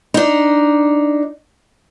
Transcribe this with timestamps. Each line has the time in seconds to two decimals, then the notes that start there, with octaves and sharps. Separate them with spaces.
0.14 D4 D#4